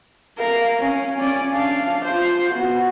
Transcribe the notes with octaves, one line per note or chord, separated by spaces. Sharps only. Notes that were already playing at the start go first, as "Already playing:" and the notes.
A#4 F5
C#4 F5
C#4 D5
D4 F5
F4 C5
B3 F#4